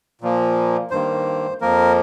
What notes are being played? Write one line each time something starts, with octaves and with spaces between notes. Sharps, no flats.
A#2 F3 A#3
G2 D#3 A#3 C5
F2 F3 A#3 A#4